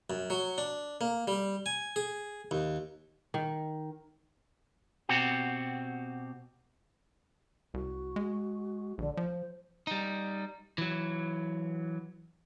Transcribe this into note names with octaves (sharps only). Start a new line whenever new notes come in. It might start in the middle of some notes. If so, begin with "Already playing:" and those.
F#2
F#3
D4
A#3
G3
G#5
G#4
D#2
D#3
B2 C4 F#4 G4
C2 F#4
G#3
A#1 D3
F3 C5
G3 D#4
E3 F#3